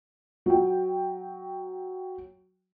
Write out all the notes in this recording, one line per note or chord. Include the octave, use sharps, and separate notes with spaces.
F#3 G5